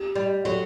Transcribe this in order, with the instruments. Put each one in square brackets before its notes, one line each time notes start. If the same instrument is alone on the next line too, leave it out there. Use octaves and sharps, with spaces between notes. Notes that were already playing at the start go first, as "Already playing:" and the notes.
Already playing: [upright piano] G4
[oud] G3
[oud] F#3 [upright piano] A4